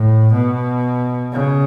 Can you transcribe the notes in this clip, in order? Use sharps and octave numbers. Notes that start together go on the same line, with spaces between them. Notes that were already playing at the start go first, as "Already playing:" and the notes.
Already playing: A2
B2
C#3